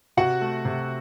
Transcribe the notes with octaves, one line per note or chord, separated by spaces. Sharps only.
C3 F#4 F#5
A3
C3